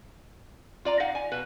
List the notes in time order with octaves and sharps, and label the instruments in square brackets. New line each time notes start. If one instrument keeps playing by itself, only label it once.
[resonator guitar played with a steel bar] F4 D5 A#5
D#4 F5 F#5
G#5
B2 B4